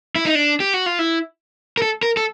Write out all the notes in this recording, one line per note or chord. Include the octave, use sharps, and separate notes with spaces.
E4
D#4
D4
G4
F#4
F4
E4
A#4
A4
A#4
A4